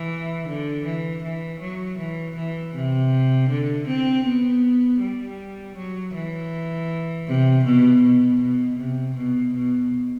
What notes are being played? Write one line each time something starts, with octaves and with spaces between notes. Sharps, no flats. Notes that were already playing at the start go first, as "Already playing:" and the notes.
Already playing: E3
D3
E3
E3
F#3
E3
E3
C3
D3
C4
B3
G3
F#3
E3
C3
B2
B2
B2
C3
B2
B2